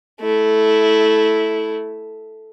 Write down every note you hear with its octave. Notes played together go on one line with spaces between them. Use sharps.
A3 E4